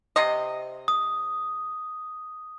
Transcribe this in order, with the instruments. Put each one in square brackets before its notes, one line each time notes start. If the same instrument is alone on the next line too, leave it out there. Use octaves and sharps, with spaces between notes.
[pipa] C3 C4 D#5
[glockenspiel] D#6